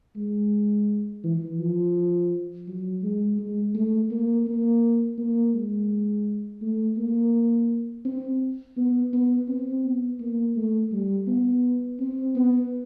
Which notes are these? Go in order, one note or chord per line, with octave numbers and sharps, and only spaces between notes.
G#3
E3
F3
F#3
G#3
G#3
A3
A#3
A#3
A#3
G#3
A3
A#3
C4
B3
B3
C4
B3
A#3
A3
G3
B3
C4
B3